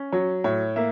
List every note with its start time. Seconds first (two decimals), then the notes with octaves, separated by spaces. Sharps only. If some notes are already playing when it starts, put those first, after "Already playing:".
Already playing: C#4
0.12 F#3 C#5
0.44 A2 C#5
0.76 A#3 E5